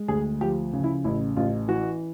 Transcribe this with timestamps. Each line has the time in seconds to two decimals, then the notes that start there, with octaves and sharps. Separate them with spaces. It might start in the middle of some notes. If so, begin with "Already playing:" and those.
Already playing: G#3
0.08 D2 G#4
0.41 F3 G4
0.73 C#3
0.84 E4
1.04 A1 E4
1.36 A1 F4
1.68 E3 F#4